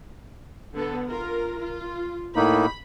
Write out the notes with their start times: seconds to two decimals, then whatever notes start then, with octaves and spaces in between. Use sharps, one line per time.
0.74 D3 B3 A4
1.06 F4 A#4
1.60 F4
2.36 A2 A#3 D#4 B5